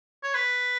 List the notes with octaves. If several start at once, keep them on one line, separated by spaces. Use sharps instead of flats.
C#5
B4